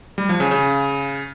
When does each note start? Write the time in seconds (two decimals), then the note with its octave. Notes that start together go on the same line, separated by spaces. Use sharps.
0.18 G3
0.29 F3
0.40 C#3
0.51 C#3